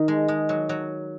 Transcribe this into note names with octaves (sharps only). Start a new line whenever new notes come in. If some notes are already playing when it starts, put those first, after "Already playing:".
Already playing: D#3
G#3
G#3
F#3
F#3